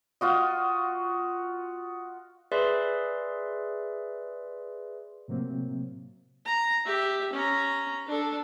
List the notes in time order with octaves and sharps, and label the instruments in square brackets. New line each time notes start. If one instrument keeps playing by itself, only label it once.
[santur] F4 F#4 D#5
[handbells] G#4 B4 D5 E5 C6
[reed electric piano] A2 C3 F#3 A#3 C4
[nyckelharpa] A#5
G4 E5
C#4 A#5
D4 A4